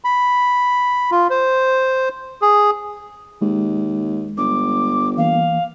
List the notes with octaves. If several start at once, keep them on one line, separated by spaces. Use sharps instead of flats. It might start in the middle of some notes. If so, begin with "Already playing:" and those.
B5
F4
C5
G#4
D#2 G#3
G1 D6
E3 A#3 F5